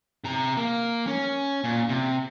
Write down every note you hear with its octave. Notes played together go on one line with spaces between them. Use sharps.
C3 A#5
A#3
C#4
A#2
C3